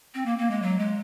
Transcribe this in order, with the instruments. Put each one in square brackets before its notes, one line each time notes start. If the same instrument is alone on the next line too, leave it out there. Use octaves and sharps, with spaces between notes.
[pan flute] C4
A#3
A#3
G#3
F#3
G#3